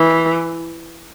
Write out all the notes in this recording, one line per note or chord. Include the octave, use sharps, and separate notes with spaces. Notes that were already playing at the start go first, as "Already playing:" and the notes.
Already playing: E3